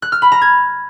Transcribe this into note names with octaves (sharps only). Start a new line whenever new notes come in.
F#6
F6
B5
A#5
G#6